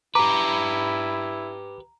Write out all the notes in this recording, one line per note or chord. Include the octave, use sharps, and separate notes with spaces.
E4 G4 B4 A#5 D6